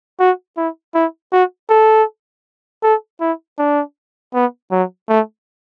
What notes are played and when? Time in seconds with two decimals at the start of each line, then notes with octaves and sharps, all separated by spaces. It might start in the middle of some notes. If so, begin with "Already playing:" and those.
0.20 F#4
0.57 E4
0.95 E4
1.32 F#4
1.69 A4
2.83 A4
3.21 E4
3.59 D4
4.34 B3
4.72 F#3
5.09 A3